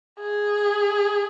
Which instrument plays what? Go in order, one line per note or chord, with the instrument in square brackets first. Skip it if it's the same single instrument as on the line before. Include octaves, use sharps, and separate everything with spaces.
[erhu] G#4